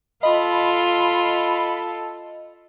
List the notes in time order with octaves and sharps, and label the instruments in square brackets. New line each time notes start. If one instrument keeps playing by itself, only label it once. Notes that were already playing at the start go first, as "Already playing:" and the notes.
[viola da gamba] F4 [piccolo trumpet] A4 [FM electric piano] D#5 [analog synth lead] B5